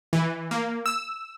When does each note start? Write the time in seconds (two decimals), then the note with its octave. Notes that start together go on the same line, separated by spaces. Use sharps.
0.13 E3
0.51 A#3
0.86 E6